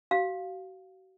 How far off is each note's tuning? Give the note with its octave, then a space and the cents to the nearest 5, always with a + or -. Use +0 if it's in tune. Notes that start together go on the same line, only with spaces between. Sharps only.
F#4 +35 F5 +5